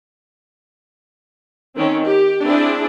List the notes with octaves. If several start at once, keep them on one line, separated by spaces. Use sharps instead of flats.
D#3 C4 C#4
G4
C4 D4 E4 G#4